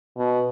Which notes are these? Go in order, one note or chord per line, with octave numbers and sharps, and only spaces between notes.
B2